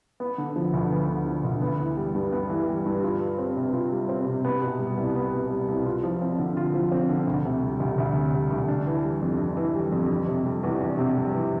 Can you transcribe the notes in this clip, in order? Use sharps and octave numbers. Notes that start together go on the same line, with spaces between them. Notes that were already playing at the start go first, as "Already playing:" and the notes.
B3
D3
F3
D2
B3
D3
F3
D2
B3
E3
G3
G2
B3
E3
G3
G2
F4
G3
C4
C3
F4
G3
C4
C3
B3
B2
G3
C2
B3
B2
G3
C2
F4
F3
C4
D3
F4
F3
C4
D3
D2
C3
G3
D2
D2
C3
G3
D2
D4
E3
G3
F2
D4
E3
G3
F2
D4
C3
G3
E2
D4
C3
G3
E2